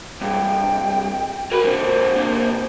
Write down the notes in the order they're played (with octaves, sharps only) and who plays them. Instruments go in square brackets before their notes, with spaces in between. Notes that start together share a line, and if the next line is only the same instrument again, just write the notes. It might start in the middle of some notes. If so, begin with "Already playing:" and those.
[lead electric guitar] C2 G2 [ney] G5
[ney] F#4 [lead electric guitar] A#4 B5
[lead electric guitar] A#2 D3 [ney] C5
[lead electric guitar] C3 A#3